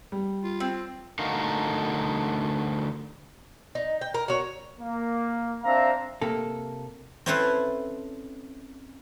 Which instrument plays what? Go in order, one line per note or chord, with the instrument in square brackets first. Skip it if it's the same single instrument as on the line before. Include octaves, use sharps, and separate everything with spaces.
[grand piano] G3
[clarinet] F4
[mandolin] C4
[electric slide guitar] D3 A3 D#4 F#4 A#4 F5
[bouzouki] D#4
G5
A#4
F#4 C#5
[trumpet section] A#3
C4 D4 E5 F5 A#5
[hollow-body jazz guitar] C3 A#3 A4
[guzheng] C4 C#4 E4 A4 B4 C5